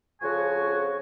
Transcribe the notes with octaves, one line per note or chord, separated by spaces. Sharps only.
F2 C#3 F3 F#4 G#5 C#6